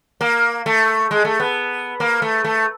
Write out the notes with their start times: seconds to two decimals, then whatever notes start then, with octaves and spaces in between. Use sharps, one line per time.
0.21 A#3
0.66 A3
1.11 G#3
1.25 A3
1.40 B3
2.00 A#3
2.22 A3
2.44 A3